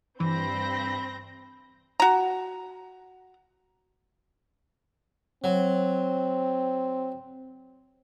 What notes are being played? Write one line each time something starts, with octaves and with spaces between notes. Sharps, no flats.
G2 E3 C4 B5 G6 A#6
F#4 A#5
F#3 C4